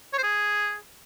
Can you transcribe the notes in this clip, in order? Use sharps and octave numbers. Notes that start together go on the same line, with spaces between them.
C#5
C5
G#4